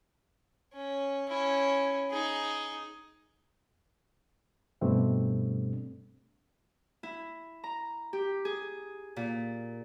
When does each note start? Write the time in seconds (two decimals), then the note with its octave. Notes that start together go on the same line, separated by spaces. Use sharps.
0.73 C#4
1.28 C#4 E4
2.10 D#4 G#4
4.81 G2 B2 G3 A3 C4 D4
7.03 E4
7.64 A#5
8.13 G4
8.45 G#4
9.16 A#2